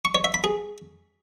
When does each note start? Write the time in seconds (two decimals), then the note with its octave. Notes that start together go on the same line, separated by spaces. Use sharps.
0.05 C#6
0.15 C#5
0.24 E5
0.34 B5
0.44 G#4